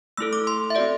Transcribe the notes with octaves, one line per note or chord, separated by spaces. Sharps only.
A3 E4 A4 E6
D6
C6
E5
C4 F#4 A4 D5